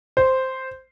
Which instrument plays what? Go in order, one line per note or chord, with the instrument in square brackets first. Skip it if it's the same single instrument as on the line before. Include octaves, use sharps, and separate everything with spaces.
[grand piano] C5